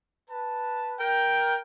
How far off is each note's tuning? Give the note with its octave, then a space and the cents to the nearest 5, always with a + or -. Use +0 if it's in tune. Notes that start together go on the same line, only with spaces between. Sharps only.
B4 -5 A5 +0
A#4 +15 G5 +0